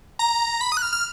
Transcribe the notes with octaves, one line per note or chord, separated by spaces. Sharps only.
A#5
B5
D#6
F#6
F6
F6